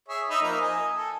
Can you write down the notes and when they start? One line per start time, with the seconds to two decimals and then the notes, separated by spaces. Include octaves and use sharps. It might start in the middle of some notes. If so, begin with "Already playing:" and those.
0.08 G#4 C#5 E5
0.30 D#4 E5 B5
0.42 F3 A#3 D#4
0.61 D#5 G#5
0.97 A4